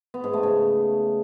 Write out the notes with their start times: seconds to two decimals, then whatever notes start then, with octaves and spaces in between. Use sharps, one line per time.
0.14 B3
0.24 G#2
0.33 A3
0.43 C#3